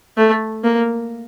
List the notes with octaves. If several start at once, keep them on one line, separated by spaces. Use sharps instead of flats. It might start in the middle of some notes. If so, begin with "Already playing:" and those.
A3
A#3